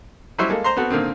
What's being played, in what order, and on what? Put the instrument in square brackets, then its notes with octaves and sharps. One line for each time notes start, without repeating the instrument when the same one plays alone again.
[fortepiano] F#3 G3 E4 C5 E5 C#6
G#3 A#3 A4
C5 A#5 C6
B3 C4 F#4 A4
A#2 D3 D#3 C4